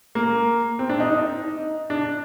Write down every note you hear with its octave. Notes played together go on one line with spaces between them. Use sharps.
A#3
C4
D4
D#4
D#4
D4